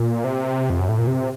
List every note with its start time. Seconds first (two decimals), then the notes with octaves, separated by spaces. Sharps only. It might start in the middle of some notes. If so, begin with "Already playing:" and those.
Already playing: A#2
0.24 C3
0.70 F2
0.79 F#2
0.89 A2
0.98 A#2
1.07 C3